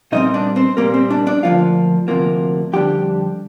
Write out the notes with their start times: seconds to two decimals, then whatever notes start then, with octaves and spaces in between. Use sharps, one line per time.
0.12 A#2 G3 C4 D#4 D#5
0.34 D4 D5
0.56 C4 C5
0.77 A#2 G3 A#3 C4 A#4
0.94 C4 C5
1.10 D4 D5
1.27 D4 D5
1.43 D2 C3 F3 A#3 F4 F5
2.08 D2 C3 F3 A#3
2.73 F2 D3 G3 D4 G4 G5